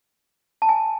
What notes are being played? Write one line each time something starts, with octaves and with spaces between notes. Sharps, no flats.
A5
G#5